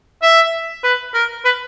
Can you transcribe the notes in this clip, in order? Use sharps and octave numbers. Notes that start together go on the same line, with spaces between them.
E5
B4
A#4
B4